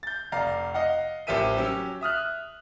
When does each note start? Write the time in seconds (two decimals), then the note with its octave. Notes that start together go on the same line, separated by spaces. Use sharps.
0.03 G6 A6
0.32 F1 D5 F5 A#5
0.74 D#5 F5 F#5
1.27 A1 F3 G4 A#4 E5 D#7
1.57 F#3 C#4 G4 E6
2.01 E5 D#6 F6 F#6